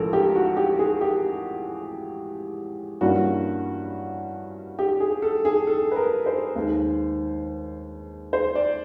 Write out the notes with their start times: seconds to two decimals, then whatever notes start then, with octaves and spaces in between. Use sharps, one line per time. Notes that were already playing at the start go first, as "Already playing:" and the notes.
Already playing: A1 A2 F3 G#3 C#4 A4 A#4
0.13 G4
0.35 F#4
0.57 G4
0.79 G#4
1.01 G4
3.01 G2 E3 G3 A#3 C#4 F#4
4.79 G4
5.00 G#4
5.22 A4
5.45 G#4
5.67 A4
5.91 B4
5.96 A#4
6.26 C5
6.56 D#2 D#3 G#3
8.33 C5
8.55 D5